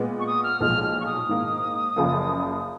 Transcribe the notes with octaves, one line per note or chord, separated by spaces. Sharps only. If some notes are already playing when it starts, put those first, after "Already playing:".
Already playing: A#2 G#3 B3
C#6
D#6
F6
B1 A#2 F3 G#3 F6
F6
C#6
D#6
G#2 D#3 A#3
F#1 F#2 C#3 F3 A#3